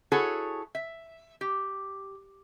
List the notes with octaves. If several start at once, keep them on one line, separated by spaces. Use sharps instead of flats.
E4 F#4 G#4 A4 C#5
E5
G4